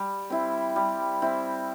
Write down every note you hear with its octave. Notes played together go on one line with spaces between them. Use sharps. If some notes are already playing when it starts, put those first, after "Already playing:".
Already playing: G3
C4 E4
G3
C4 E4